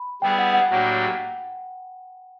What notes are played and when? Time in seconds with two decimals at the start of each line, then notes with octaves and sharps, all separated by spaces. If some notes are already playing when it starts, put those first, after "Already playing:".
Already playing: B5
0.22 G3 B3 E4 G#4 B4 G5
0.39 F#5
0.53 F#5
0.69 A2 F#3 A#3 D4 G4